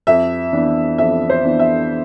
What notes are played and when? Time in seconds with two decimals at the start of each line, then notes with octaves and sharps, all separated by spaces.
0.07 F2 E5
0.53 E3 B3 D4
0.98 F2 E5
1.30 C5
1.44 E3 B3 D4
1.59 E5